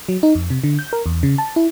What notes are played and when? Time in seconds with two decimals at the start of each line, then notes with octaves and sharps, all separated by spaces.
0.09 F#3
0.23 D#4
0.35 F2
0.50 C3
0.64 D3
0.79 G6
0.93 A#4
1.06 E2
1.23 C#3
1.38 A5
1.56 E4